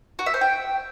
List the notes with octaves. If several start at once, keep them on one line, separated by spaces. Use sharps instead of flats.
F#4
E5
C5
G5